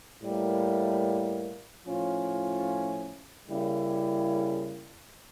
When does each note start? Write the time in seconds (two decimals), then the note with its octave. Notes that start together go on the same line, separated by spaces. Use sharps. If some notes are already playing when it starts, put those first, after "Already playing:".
0.21 A2 G3 A#3
1.84 A2 F3 C#4 F4
3.48 C#3 G3 A#3 E4